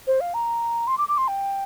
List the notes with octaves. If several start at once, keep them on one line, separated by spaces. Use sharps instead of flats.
C5
F5
A#5
C6
D6
D6
C6
G5